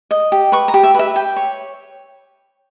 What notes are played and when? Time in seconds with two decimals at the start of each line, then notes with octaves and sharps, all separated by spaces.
0.11 D#5
0.32 G4
0.52 B4 C#6
0.68 A#5
0.74 G4
0.83 E5
0.94 B4 E5
1.15 G4 G5
1.36 C#5